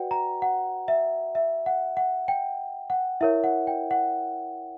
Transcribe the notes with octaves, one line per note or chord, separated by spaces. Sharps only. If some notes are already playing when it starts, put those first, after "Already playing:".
Already playing: F#4 B4 D5 F#5 G5
A#5
F#5
E5
E5
F#5
F#5
G5
F#5
E4 A#4 C#5 E5
F#5
G5
F#5